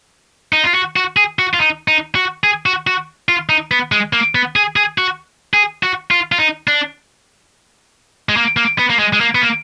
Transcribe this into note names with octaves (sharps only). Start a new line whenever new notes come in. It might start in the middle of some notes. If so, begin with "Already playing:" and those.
D#4
F4
F#4
F#4
G#4
F#4
F4
D#4
D#4
F#4
G#4
F#4
F#4
F4
D#4
B3
G#3
A#3
B3
G#4
G#4
F#4
G#4
F#4
F4
F4
D#4
D4
G#3
A#3
A#3
B3
A#3
G#3
G#3
A#3
B3
A#3